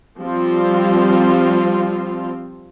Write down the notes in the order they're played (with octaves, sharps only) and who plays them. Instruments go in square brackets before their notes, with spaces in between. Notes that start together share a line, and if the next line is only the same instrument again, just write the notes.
[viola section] F3 G3 C4 F4